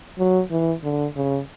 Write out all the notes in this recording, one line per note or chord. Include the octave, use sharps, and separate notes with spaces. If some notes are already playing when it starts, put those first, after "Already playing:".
F#3
E3
D3
C#3